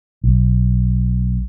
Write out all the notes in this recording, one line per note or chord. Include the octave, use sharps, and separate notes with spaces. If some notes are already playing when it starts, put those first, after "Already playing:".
B1